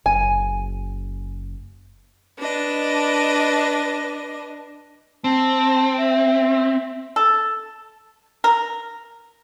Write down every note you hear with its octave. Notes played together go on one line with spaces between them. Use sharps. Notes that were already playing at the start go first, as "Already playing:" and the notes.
F#1 G#5
D4 B4 D#5
C4 A5
E5
A4
A#4